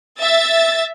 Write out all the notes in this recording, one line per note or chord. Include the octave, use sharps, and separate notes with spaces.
E5 A6